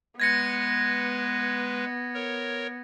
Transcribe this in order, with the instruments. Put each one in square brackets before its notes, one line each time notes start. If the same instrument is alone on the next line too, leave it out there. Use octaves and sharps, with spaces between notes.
[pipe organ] G#3 B4 [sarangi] B3 [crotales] G#6 A#6 C#7
[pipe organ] A#4 C#5